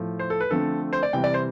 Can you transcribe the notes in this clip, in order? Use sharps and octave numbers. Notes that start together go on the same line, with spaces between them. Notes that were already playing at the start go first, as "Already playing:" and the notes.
Already playing: A2 F3 A3
C5
A4
B4
D3 F3 A3 C4 A4
C5
D5
C3 E3 G3 C4 G5
D5
C5